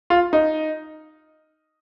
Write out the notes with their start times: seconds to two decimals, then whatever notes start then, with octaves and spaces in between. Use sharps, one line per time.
0.10 F4
0.33 D#4